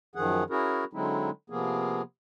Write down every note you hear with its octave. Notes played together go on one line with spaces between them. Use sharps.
F#2 D#3 F3 G#4 F#5
C#4 E4 F#4 G#4 A#4
D3 F#3 G#3 C4 D#4 E4
C3 F3 A#3 B3 G#4